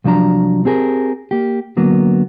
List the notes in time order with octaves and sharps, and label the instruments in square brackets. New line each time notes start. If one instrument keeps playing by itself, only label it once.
[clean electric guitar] C2 F3 F#3 D4 A#5
C4 G4 G#4 A#4
A#3 G4
D3 F#3 A#3 B3